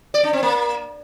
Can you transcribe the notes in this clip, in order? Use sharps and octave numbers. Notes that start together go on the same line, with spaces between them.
D5
D4
C4
A#3